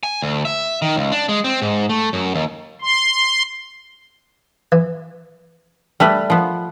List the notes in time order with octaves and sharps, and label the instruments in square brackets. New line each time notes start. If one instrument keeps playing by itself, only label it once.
[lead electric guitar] G#5
D2
E5
D#3
C#2
D4
G#3
C4
G#2
A3
F#2
D#2
[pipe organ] C6
[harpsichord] E3
[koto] G3 A3 B4
F3 B3